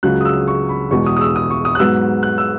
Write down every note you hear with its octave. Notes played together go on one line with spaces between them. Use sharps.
C#2 C#3 F#3 F#6
D#6
E6
C#6
B5
E2 B2 G#3 C#6
D#6
D#6
E6
D#6
C#6
D#6
F#6
G#2 F#3 B3 E6
F#6
E6